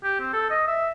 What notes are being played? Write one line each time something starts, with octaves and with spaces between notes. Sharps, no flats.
G4
C4
A4
D#5
E5